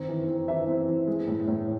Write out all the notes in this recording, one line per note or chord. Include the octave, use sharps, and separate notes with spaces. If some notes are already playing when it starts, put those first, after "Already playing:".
Already playing: D#3 C4
E3
C4
E3 E5
C4
E3
G#3
A2
A2